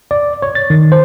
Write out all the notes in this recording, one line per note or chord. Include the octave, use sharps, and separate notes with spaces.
D5
C#5
A6
D#3
C5